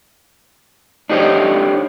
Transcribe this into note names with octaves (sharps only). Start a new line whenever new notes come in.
D4 D#4 G4 C5 C#5